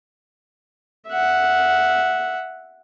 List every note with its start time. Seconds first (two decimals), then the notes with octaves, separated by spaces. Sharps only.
1.09 E5 F#5